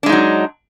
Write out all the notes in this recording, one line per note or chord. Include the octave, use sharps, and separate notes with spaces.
F#3 G#3 D4 D#4